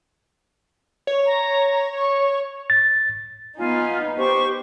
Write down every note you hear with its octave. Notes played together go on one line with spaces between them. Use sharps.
C#5
A#5
C#6
A6
B3 D#4 F4 F5 G#5
G4 C5 C#6